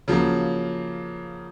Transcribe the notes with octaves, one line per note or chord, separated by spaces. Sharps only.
C#3 F3 F#3 A#3